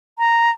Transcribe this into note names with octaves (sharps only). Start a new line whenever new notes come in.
A#5